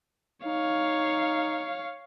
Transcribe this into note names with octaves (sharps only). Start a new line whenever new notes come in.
D#4 C#5 F5